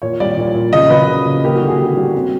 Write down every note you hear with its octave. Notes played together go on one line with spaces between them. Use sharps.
A#2 C#5
G3 D5
A#2
A#2
C#3 D#5
F#3 B4
C#3
C#3
A#3 G4
F#4
D3
G#4
D3 G4
G3 F#4
C4